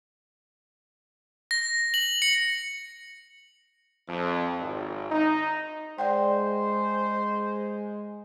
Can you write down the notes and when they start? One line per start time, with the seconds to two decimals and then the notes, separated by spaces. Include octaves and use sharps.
1.51 A#6
1.94 F#7
2.22 C#7
4.07 F2
4.59 G#1
5.11 D#4
5.98 G#3 C5 D5 F#5 G5